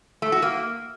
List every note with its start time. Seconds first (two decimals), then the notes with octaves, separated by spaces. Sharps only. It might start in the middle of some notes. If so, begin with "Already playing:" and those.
0.22 A3
0.32 F#4
0.42 A#3